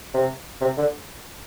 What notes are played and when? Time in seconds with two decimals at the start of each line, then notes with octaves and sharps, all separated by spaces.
0.14 C3
0.61 C3
0.78 D3